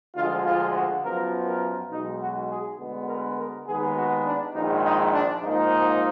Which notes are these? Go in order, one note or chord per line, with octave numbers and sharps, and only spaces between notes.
D2 D3 F3 G#3 F4
F4
F#4
F#2 F3 B3 A#4
A#4
B1 B2 G#3 D#4
F#4
G#4
D2 D3 G#3 B3
A#4
A#4
D#2 D#3 G#3 B3 G#4
F#4
D4
A#1 G#2 D#3 G#3 D#4
D#4
D4
G#2 F3 A#3 D#4